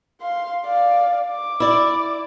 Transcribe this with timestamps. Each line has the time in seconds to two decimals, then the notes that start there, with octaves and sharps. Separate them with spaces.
0.22 F5 C6
0.66 D5 F5
1.29 D6
1.60 E4 D5